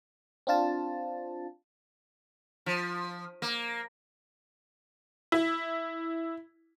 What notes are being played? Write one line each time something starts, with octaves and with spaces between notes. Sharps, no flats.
C4 D4 F4 A5
F3
A#3
E4